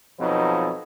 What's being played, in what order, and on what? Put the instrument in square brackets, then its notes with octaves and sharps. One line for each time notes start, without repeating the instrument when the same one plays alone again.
[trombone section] F2 B2 F3 F#3 D#4 B4